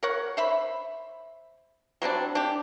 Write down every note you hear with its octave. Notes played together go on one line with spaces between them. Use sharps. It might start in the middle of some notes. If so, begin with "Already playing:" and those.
A#4 C#5 F#5
C5 E5 B5
F#3 G3 C4 D4
D4 G4